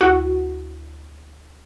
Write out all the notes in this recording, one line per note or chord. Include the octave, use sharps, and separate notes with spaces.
D2 E4 F#4